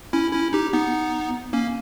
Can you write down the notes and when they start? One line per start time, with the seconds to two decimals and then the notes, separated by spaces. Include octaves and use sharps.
0.13 C#4 E4
0.33 C#4 E4
0.53 D#4 G4
0.73 B3 D#4
1.53 A#3 C#4